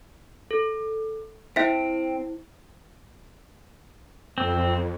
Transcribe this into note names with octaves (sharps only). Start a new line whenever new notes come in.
A4
C4 E4 C5 E5 B6
F2 C4